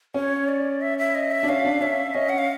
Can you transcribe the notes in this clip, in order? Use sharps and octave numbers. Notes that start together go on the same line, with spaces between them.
C#4 C#5
D5
E5
E5
D#5
E5
D4
C#4 F5
D4
C#4 E5
C#4 D#5
F#5
F5